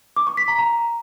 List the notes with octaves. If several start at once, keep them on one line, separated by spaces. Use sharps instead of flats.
D6
C#6
B6
A#5
A#5